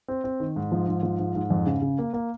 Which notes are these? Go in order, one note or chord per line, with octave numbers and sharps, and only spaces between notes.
C4
C4
D#3
G#2
F3
G#2
F3
G#2
G#2
F2
C#3
C#3
A#3
A#3